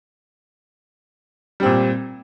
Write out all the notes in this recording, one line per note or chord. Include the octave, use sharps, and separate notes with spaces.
A#2 G3 C4